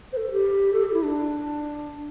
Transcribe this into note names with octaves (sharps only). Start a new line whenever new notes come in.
C5
A4
G4
A4
G4
E4
D4